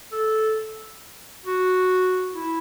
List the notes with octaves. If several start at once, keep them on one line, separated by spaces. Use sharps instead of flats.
A4
F#4
E4